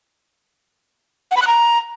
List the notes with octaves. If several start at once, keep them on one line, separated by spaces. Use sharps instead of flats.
F#5
B5
F#6
A#5